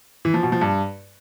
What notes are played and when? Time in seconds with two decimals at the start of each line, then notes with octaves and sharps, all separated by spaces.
0.25 E3
0.34 F3
0.43 B2
0.52 F3
0.61 G2